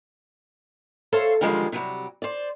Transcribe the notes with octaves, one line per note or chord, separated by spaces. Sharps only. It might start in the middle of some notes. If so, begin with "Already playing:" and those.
A4 C5 C#5 E5 F5
D3 D#3 F3 G3 G#3
C3 F#3 G3
C5 D5